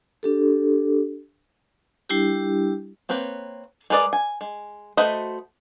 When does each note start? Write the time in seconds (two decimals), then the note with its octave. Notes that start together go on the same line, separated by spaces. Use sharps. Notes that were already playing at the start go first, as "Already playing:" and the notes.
0.23 D4 G4 A4
2.09 G3 D4 E4 G4
3.09 A#3 C4 B4 C#5
3.90 G#3 A#4 B4 D5 D#5
4.13 G#5
4.41 G#3
4.97 A3 F#4 B4 C5 D#5